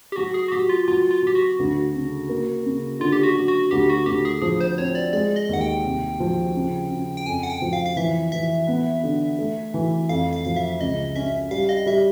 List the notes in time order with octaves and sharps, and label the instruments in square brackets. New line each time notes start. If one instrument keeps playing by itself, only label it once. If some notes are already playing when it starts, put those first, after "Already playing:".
[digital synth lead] G4
[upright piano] F#3 [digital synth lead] F#4
[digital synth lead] G#4
F#4
[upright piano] F#3 [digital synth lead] G4
[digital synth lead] F4
[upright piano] F#3 [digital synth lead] F4
[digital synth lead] F4
[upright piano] F#3 [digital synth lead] G4
[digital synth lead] F#4
[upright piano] D2
C#3
A#3
C#3
[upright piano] D3 [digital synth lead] F4
[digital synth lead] G4
F#4
[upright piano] F#3
[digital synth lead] F#4
[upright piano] D2 [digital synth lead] G4
[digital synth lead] F#4
[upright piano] D2 [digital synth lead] G4
[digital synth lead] G#4
[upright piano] F3 [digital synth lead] G#4
[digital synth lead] C5
[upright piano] C4 [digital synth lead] C#5
[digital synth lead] D5
[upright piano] G#3 [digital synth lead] D5
[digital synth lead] D#5
[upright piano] D#2 [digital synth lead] F#5
[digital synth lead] G5
[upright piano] C2
F3
C#3
C#3
[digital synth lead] G5
[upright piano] F2 [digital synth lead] G#5
[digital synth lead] F#5
G5
[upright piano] F3
[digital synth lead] F5
F5
[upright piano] E3 [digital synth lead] E5
[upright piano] E3 [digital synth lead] E5
[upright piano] B3
D3
A3
E3
[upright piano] F2 [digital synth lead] F5
[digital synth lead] F5
[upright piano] F3 [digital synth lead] F5
[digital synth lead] E5
[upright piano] C#2 [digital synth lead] D#5
[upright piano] C#4 [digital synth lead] E5
[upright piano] G3 [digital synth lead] F5
[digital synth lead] D#5
[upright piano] G3 [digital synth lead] E5